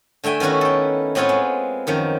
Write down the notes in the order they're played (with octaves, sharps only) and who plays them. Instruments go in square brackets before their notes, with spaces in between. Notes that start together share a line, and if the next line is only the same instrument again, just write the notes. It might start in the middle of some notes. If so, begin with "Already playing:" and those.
[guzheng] D3 A3 E5 G5 G#5
D#3 B3 C#4 E4 F#4
A4 G5
A2 B3 C4 F4 C#5 G#5
G#3
F#2 D#3 F3